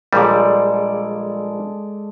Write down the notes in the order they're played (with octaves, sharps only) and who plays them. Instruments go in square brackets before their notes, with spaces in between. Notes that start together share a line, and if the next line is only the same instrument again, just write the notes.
[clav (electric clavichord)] A#1 A#2 G3 [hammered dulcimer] G#3 A4 D5